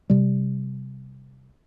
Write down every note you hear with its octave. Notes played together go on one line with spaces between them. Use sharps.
C3 G3